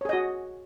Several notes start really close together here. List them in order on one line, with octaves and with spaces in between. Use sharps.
C#5 G#4 D#5 F#4